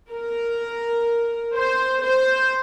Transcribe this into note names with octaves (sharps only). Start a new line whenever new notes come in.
A#4
C5
C5